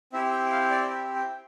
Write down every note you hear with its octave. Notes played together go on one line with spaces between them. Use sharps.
C4 E4 G4 E5
G5
G5
F5
D5
E5
G5